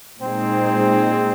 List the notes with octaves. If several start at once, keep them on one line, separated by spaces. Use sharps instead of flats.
A#2 G#3 C4 D#4 G#4